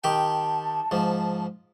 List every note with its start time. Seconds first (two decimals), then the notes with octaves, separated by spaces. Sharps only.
0.04 D#3 G4 G5 A5
0.91 G#2 F3